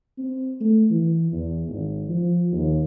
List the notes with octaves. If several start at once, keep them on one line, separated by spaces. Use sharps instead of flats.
C4
A3
E3
E2
G#1
F3
D#2